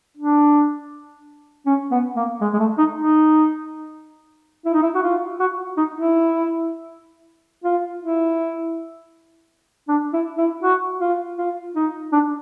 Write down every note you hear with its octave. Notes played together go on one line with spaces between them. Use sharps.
D4
C#4
B3
A#3
G#3
G#3
A3
D#4
D#4
E4
D#4
E4
F#4
F4
F#4
D#4
E4
F4
E4
D4
E4
E4
F#4
F4
F4
D#4
D4